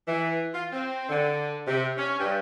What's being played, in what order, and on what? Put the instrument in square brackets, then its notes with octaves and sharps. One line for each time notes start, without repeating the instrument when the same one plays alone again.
[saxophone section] E3
F4
C4
D3
C3
C#4
G2